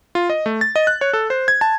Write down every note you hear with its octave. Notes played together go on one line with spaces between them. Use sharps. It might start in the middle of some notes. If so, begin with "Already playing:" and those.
F4
D#5
A3
A6
D#5
F#6
C#5
A4
C5
G#6
A5